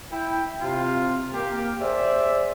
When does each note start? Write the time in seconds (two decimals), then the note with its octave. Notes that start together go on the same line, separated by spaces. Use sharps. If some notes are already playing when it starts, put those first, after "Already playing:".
0.12 E4 G5
0.62 C3 F4
1.34 A#3 G4
1.80 G#4 C5 D5 E5